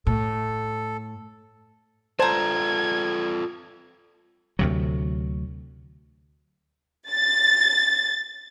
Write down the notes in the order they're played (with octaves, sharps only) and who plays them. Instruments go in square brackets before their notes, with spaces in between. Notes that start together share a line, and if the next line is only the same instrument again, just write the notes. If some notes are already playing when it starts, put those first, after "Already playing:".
[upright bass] A2 [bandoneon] A4
[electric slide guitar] F4 A4 D5 [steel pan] C5 [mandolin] A5 A#5 [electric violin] G#6
[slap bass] D2 C3 F#3
[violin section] A6